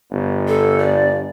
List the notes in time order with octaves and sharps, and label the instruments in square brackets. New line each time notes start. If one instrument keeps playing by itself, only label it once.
[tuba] G1
[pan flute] A4
D5